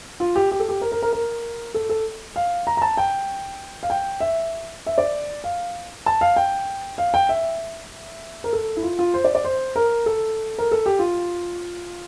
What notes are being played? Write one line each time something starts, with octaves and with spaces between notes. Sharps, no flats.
F4
G4
G4
A4
G4
A#4
A#4
A#4
A#4
A4
A4
F5
A#5
A#5
A5
G5
F5
G5
E5
E5
D5
F5
A5
F5
G5
F5
G5
E5
A#4
A4
E4
F4
F4
C5
D5
D5
C5
A#4
A4
A#4
A4
G4
F4